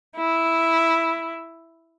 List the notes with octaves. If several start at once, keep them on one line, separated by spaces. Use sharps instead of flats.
E4